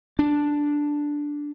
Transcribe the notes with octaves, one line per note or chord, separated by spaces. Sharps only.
D4